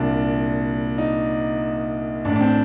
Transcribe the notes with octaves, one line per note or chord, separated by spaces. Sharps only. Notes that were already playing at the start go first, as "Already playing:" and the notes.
Already playing: C2 A#2 D4
D#4
A1 A2 D4
D4
C4